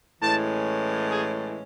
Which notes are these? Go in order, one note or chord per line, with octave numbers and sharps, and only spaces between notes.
A2 E3 G#3 C#4 A5
G#4